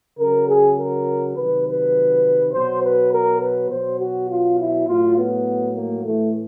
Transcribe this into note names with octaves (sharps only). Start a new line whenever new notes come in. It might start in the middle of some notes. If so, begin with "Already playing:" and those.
C#3 F#3 A#4
G#4
A#4
C3 D#3 F#3 B4
B4
B2 F#3 C5
B4
A#4
B4
B2 F#3 C5
F#4
F4
E4
A2 F#3 F4
B3
A#3
A2 E3 A3